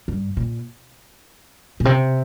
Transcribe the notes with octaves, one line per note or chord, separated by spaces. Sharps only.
G2
A#2
A#2
C3